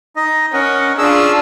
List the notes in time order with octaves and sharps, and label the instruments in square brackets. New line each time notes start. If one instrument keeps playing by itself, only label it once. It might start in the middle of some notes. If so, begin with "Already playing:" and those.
[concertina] D#4 D#5
[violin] C#4 [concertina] A#4 D#5 F#5
[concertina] C#4 G#4 E6 [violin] D4 F4